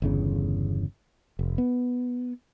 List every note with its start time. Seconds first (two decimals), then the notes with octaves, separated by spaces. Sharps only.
0.02 G1 E2 C#3
1.39 F1
1.58 B3